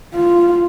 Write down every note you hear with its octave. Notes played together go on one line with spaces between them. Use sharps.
F4